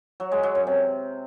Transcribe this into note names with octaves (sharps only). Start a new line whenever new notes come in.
F#3
G#3
F#3
F#2
C3